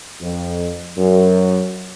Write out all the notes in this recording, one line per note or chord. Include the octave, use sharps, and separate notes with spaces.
F2
F#2